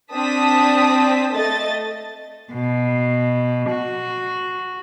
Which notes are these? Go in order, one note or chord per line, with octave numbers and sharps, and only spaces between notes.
C4 D4 A5 D#6 B6
A3 D#5 A6
B2
F#4